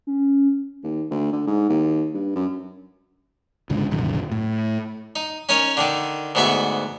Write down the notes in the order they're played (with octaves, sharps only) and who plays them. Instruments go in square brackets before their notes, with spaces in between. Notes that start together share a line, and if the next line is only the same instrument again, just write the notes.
[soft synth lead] C#4
[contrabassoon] D#2
D2
D3
G#2
D#2
G2
F#2
[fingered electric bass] C#2 G#2 D3
D#1 C2 F#2 D3
A2
[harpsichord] D#4
C#4 D#4 A#4 C#5
D3 D#3 D#4
D2 G#2 B3 F#4 E5 C#6